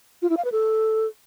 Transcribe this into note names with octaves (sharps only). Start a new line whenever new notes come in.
F4
E4
F5
B4
A4